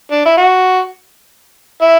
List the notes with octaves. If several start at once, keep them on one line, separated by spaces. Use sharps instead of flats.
D4
E4
F#4
E4